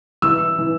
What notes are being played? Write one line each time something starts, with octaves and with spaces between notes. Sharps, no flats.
E3 E6
E3